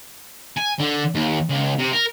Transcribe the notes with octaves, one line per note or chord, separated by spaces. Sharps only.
G#5
D3
D#2
C#2
C3
A#4